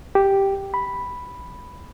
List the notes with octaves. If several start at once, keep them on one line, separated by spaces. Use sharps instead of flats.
G4
B5